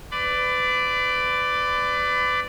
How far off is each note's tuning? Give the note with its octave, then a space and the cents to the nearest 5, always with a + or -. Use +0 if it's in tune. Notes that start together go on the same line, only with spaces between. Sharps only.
B4 +30 D5 +0 B5 +35